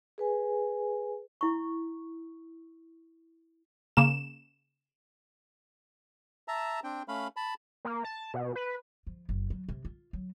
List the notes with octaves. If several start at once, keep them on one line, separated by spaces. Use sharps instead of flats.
G#4 B4 G#5
E4 C#6
C#3 A#3 E7
E5 A5 A#5
C4 D4 G5
A3 C#4 F5 B5
A5 B5
A#3
A5
B2
B4
F3
F#1
F#3
C3
F4
F#3